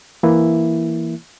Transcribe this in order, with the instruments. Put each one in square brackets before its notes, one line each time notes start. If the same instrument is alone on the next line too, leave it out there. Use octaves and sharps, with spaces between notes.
[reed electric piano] E3 A#3 E4